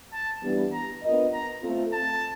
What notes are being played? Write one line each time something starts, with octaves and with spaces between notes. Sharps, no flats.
A5
E3 G3 B3 D4 G4
A#5
B3 D4 F4 A#4 D#5
A#5
A3 C4 F4 A4
A5